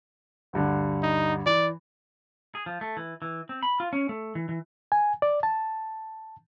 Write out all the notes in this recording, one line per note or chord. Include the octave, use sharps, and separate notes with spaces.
D2 G2 D3
D#4
E3 D5
G#4
F3
A3
E3
E3
C4
B5
F4
C#4
A3
E3
E3
G#5
D5
A5